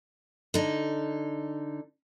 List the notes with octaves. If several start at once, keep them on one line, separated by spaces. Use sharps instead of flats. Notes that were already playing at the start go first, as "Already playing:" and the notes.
D3 D#4